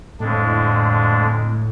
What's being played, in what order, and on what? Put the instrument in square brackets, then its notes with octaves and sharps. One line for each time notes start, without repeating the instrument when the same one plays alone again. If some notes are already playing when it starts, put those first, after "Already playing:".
[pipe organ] F2 D3 G#3 D4 [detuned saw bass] A2